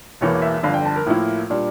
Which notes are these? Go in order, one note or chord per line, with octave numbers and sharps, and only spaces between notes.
E1 E2 E3 A#3 C#5
E5
G1 F2 D3 F5
G5
A5
A#4
A2 F3 A#3 E4
A#2 G3 D4